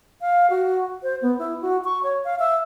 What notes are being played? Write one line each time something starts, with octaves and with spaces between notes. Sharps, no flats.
F5
F#4
C5
B3
E4
F#4
C#6
C#5
F5
E5